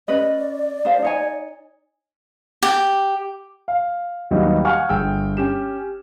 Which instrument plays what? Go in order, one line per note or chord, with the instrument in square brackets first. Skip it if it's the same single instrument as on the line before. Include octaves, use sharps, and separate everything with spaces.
[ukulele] C#4 B4 D#5 [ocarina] D5
[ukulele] D4 C5 F5
D#4 C#5 G#5
[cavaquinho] G4
[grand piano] F5
D#2 F#3 G3 B3 D#4
F5 F#5 G#5 C#6 F6
G1 G#4 G5 E6
C#4 G4 E7